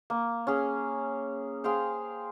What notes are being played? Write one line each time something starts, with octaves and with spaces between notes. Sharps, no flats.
A#3
C#4 G#4
G#4 C5 F5 G5